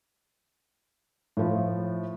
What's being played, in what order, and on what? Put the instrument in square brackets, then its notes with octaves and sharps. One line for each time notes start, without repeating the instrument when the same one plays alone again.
[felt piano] A2 F3